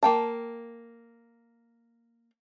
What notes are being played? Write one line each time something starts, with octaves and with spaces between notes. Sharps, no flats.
A#3 G5 A5